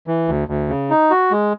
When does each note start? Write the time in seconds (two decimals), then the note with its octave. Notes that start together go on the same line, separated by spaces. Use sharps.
0.07 E3
0.28 D2
0.48 D2
0.69 C#3
0.90 D#4
1.10 F#4
1.31 G#3